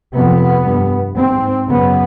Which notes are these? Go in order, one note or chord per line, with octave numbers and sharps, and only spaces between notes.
F2 C3 B3
G2
G#2 C4
F#2 C#3 B3